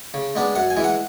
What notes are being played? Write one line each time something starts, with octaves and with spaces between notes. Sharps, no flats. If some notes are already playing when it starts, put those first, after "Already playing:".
C#3
G#3 B3 D4
F#2 F#5
G#5
E3 G#3
F#5